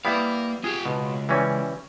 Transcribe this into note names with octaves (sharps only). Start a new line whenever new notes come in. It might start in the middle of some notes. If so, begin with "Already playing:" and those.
G3 A#3 B3 E4 F5
F4 G4 G#4
C#2 B2
E3 G3 C#4